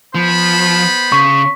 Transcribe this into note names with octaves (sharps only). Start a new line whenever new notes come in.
F3 B3 C5 B5
C#3 C#6 B6